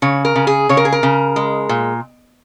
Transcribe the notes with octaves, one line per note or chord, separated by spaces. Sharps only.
C#3 C#5
A#4
C#3
G#4
C#3 C#5
A#4
G#4
A#4
C#3
G#3
A#2